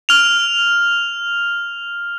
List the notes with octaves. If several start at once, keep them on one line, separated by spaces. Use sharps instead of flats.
F6 F7